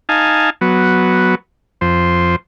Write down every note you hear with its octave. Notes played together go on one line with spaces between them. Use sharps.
D#4 F5 G#5 A5
F#3 B3
F2 C5